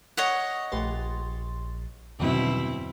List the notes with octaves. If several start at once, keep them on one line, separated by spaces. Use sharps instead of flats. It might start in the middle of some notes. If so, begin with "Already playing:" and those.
C#5 D#5 F#5
A#1 A3 G4 B4 C6 A6
E2 G2 B2 D3 D#3 F#3 C4 E4